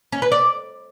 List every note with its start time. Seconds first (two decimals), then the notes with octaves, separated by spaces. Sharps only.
0.12 C#4
0.22 B4
0.32 D5